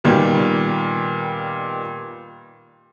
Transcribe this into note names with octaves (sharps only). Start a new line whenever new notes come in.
A#2 D#3 G3 A#3 B3